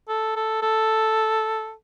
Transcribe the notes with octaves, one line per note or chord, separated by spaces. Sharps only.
A4
A4
A4